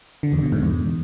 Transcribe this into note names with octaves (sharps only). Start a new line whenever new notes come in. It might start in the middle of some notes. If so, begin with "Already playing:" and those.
D3
E2
B2
G#2
E2